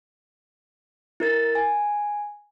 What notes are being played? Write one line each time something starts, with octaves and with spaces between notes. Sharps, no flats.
E4 A#4 A6
G#5